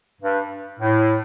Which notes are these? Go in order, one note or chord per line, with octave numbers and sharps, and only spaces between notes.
G2
A2